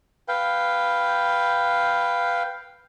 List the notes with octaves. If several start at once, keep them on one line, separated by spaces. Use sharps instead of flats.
B4 F5 G5